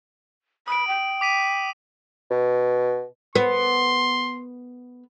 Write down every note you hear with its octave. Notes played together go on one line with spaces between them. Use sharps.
B5 D#6 D7
G5
D6 B6 D#7
B2
B3 C6